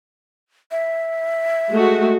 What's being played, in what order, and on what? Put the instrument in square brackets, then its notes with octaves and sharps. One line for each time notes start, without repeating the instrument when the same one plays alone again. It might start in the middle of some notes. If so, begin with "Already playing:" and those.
[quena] E5
[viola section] G#3 A3 F#4